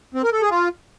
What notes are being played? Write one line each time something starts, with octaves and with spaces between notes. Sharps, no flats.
C4
A#4
A4
G#4
F4